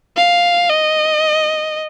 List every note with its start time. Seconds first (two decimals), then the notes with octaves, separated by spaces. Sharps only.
0.17 F5
0.69 D#5